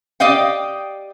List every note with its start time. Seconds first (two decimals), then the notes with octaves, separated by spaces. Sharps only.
0.20 G4 D5 D#5 F5 G5